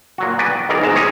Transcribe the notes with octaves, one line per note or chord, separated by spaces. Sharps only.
A#2 F#3 F#4
B3 F#4 B4 D5 G#5
G5
B1 D#3 E3 G#4 A#4 D5
G#1 G#2 E3 G#3 A5 A#5
G#3 C#4 D#4 G4 G#4 C#5